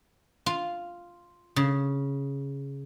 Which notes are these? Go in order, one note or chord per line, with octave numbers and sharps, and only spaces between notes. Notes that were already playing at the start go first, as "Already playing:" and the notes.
F4
C#3